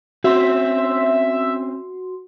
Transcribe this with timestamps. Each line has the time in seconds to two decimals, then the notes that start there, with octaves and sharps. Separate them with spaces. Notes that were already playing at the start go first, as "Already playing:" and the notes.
0.24 C4 C#4 F#4 C5 E5 C6